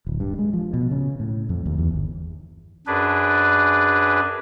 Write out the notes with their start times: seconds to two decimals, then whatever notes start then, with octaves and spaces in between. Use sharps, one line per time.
0.07 D1
0.20 G2
0.39 G#3
0.53 F3
0.74 B2
0.91 C#3
1.20 A2
1.49 F2
1.66 D#2
1.78 E2
1.91 G1
2.87 F#2 D4 G#4 B4